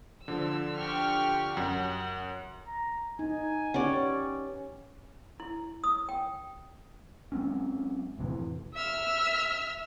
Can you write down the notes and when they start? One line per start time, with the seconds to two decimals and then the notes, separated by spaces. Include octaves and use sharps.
0.28 D3 F3 E6
0.79 G4 C#6 F6
1.57 F#2 F#5
2.67 A#5
3.19 D#4 G#5
3.74 C#4 G4 B4 D5 F#5
5.40 E4
5.84 D#6
6.09 G5
7.32 F#3 G#3 C4 C#4
8.19 F2 A2 C3 E3
8.75 E5 E6 F6